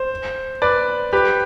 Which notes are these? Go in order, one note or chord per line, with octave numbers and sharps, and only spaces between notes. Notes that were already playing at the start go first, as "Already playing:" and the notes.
Already playing: C5
B4 D5
G4 B4